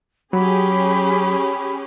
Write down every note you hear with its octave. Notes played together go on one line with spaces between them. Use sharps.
F#3 C#4 G4 G#4 B5